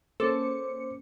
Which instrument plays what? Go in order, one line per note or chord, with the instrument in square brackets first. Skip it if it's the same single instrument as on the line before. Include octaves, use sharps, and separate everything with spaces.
[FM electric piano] A#3 C#4 C#7 [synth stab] A4 [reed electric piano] C5 D6